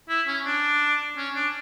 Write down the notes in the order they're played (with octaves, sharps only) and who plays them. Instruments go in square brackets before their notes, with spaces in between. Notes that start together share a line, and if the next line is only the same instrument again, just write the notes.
[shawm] E4
C#4
D4
C#4
D4